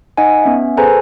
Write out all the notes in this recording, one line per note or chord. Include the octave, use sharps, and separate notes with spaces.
D#4 D#5 F#5 G#5
B3 C#4 E5
G#4 A4 B4 C5 G#5 A#5